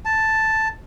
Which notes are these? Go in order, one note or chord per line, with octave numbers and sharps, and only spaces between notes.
A5